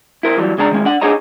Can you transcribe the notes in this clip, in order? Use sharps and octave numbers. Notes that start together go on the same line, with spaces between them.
E4 A#4 C5
E3 F#3 G3
C#2 G#3 D4 A5 A#5
D#3 G#3 C#4
D4 F#5
D4 D#4 G#4 C#5 D#5 A#5